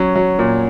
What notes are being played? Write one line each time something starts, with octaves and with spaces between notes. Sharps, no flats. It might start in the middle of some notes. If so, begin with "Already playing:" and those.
Already playing: F#3 C#4
F#3
A#2